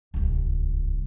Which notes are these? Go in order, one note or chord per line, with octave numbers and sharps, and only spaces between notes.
D1 C2